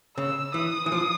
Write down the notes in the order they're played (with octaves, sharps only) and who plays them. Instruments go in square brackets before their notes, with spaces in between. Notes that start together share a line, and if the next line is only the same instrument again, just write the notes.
[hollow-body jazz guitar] C#3 [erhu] E6
[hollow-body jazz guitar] E3 [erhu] D#6
[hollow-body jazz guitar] E3
F3